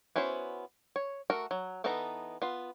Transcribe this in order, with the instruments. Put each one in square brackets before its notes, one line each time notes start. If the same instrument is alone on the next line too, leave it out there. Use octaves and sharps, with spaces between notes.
[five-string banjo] B3 C#4 E4 F#4 C5
C#5
A3 F#4 A#4
F#3
E3 B3 D#4 A4 A#5
B3 F4